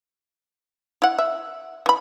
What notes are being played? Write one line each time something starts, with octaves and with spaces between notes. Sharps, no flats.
E4 F#5
E5
E3 B5